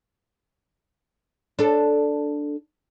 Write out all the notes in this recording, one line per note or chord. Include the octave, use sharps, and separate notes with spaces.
D4 A4